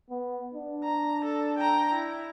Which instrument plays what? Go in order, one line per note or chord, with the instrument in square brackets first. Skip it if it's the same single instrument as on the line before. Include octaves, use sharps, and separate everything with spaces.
[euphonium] B3
D4
[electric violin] A#5
A4
G5 A#5
E4